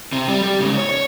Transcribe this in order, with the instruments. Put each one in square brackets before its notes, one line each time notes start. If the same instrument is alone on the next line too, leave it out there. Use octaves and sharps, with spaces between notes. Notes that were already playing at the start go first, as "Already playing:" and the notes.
[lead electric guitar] C3
G3
G3
G#2 C#3
C#5
C#5